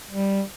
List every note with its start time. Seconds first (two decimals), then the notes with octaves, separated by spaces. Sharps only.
0.11 G3